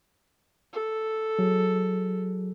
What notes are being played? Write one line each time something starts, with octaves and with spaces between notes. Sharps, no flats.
A4
F#3 G#4